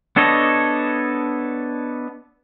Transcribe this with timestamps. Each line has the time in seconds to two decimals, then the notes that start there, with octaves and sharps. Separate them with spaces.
0.16 B3 D4 A4 C#5 D#5